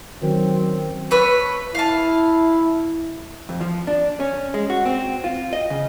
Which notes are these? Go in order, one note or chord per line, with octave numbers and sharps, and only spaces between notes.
D#3 F#3 C4 C#4
A3 B4 C#5
E4 F5 A5
F2
F3
D4
C#4
G#3
F#4
C4
F4
D#5
C#3